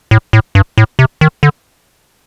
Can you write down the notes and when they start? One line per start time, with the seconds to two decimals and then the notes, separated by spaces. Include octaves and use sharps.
0.11 A2
0.33 A2
0.55 G2
0.78 A2
0.99 C3
1.21 D#3
1.43 D3